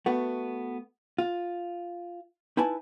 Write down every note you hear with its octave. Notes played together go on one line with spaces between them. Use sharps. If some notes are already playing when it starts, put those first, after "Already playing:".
A3 B3 F#4
F4
D#4 E4 B4 G#5 A5